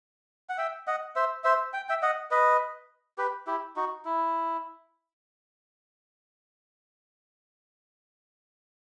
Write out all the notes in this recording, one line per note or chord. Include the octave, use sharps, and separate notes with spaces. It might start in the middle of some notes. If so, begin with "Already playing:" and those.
F#5
E5 G5
D#5 F#5
C5 E5
C5 E5
G5
E5 G5
D#5 F#5
B4 D#5
G4 B4
E4 G4
D#4 F#4
E4